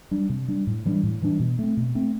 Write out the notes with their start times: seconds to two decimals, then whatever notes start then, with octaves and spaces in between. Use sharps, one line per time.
0.11 G3 D4
0.29 C3
0.48 G3 D4
0.67 A2
0.85 E3 G3 D4
1.03 A2
1.22 E3 G3 D4
1.40 B2
1.59 A3 C4
1.77 B2
1.95 A3 C4